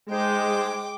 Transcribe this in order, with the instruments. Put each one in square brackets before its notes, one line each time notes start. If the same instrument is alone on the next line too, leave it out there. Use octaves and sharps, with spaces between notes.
[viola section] G#3 [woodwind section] D#4 G#4 C5 [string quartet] G5 D6